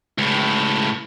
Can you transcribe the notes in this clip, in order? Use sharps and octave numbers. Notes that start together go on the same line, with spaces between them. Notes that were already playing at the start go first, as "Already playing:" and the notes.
C#2 A2